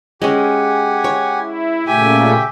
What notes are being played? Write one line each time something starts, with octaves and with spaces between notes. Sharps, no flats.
G#3 C#4 G4 F#5 G#5
C#5
E4
A#2 C#3 A3 G4 E5 G5 G#5